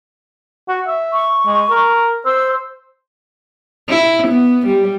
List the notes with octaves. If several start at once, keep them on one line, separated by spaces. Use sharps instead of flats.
F#4
E5
C#6
G#3
A#4
C5 E6
E4
B3
G3